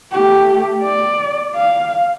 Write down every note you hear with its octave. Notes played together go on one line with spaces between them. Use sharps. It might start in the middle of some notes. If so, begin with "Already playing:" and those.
A3 G4
D5
F5